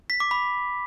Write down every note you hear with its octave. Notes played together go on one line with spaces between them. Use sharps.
B6
D6
B5